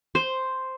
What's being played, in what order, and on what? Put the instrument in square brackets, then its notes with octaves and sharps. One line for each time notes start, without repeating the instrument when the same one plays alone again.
[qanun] C5